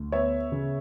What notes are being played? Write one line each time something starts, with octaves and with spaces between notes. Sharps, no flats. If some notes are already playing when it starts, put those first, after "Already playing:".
Already playing: D2
B3 C#5 E5
C#3